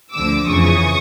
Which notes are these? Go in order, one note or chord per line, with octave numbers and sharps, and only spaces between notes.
D2 D3 F3 D6 E6
F2 C#3 E3 C#6 D#6